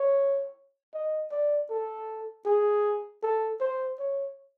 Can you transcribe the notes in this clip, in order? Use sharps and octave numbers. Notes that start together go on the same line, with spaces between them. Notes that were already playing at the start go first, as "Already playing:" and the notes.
Already playing: C#5
D#5
D5
A4
G#4
A4
C5
C#5